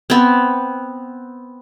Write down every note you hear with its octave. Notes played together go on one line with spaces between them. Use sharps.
B3 C4